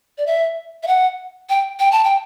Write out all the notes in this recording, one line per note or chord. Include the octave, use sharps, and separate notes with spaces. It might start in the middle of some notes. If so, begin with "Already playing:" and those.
D5
E5
E5
F#5
G5
G5
A5
G5